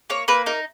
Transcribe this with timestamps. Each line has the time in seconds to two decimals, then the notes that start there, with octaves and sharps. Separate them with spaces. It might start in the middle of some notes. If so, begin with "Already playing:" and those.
0.10 A#3 C#5
0.28 A#3 B4
0.46 D#4 A#4